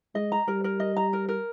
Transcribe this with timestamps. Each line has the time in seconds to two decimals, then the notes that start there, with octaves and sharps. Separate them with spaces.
0.15 G#3 D#5
0.32 A#5
0.48 G3 A#4
0.64 A#4
0.80 D#5
0.97 A#5
1.13 A#4
1.28 A#4